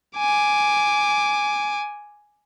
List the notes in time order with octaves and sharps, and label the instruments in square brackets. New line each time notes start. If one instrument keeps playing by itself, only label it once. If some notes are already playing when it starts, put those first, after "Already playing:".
[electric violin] G#5 D6